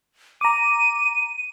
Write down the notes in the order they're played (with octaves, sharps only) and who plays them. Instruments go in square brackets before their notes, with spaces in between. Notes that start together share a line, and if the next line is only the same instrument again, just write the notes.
[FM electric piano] A#5 D6 [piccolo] D#7